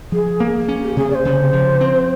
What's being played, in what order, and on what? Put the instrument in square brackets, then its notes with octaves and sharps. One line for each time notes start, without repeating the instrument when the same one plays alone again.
[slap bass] F3 [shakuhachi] G#4
[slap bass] A#3
C#4
[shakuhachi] G4
[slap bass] C3 [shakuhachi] G#4
[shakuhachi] D5
C5
[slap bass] C#3
F3
C4